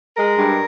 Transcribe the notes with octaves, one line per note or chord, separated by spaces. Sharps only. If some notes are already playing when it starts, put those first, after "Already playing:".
G#3 A#4
G2